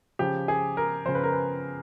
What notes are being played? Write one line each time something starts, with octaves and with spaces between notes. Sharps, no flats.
C#3 F3 G4
G#4
A#4
C#3 F3 C5
B4
A#4
B4